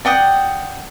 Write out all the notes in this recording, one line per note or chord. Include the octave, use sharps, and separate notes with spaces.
D5 F#5 G5 D#6